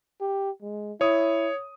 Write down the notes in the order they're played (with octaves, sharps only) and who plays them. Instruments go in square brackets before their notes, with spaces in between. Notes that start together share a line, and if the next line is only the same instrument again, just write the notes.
[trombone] G4
G#3
[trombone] E4 [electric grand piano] C#5 D#6